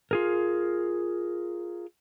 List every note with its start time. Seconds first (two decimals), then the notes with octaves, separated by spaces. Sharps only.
0.11 F4 G#4 A#4